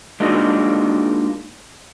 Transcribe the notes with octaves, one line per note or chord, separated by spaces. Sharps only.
G#3 A#3 D4 D#4 F4 F#4